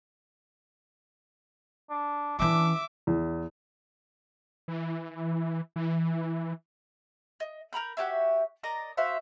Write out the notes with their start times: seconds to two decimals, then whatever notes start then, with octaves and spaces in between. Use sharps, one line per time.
1.90 D4
2.39 E3 C#4 D4 E5 D6
3.07 E2
4.68 E3
5.76 E3
7.40 D#5
7.73 A#4 A#5 B5 G6
7.97 F#4 G4 C#5 E5
8.63 A#4 D5 D#5 A#5
8.97 F#4 C5 E5 F5